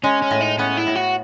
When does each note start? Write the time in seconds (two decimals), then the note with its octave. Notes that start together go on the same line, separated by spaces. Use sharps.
0.04 G#3 C#4
0.22 C#4
0.31 A2
0.41 D#4
0.58 B3 C#4
0.77 E4
0.87 A2
0.95 F#4